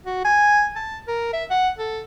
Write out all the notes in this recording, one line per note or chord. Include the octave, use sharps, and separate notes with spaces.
F#4
G#5
A5
A#4
E5
F#5
A4